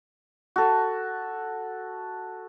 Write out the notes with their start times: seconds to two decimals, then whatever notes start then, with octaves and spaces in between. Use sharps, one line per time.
0.56 F#4 A4